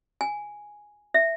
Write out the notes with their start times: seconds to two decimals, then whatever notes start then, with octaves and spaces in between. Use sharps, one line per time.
0.21 G#5
1.14 E5